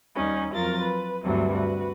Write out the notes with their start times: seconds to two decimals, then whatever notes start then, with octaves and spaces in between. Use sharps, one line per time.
0.16 D#2 G3 C#4 D#4
0.55 F2 F#3 F4 A#4 A6
0.84 B4
1.24 D2 G2 C3 E3 F#3
1.54 F#4 B4